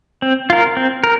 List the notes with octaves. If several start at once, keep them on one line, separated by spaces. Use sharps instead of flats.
C4
F4 A#4
C4
A#4